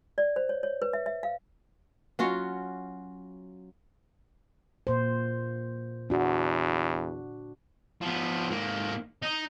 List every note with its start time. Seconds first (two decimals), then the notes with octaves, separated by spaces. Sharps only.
0.18 D5
0.36 C5
0.49 C#5
0.63 C#5
0.82 B4
0.93 E5
1.06 E5
1.23 F5
2.19 F#3 C#4 F4 F#4
4.87 A#2 C5
6.10 E2 D4 F#4
8.02 F3 B3
8.50 G#2 A#3
9.22 D#4